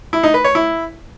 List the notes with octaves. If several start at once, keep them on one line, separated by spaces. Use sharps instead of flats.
E4
D#4
B4
C#5
E4